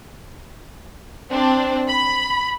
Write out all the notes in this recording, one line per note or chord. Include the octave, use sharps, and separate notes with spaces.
C4 D4
B5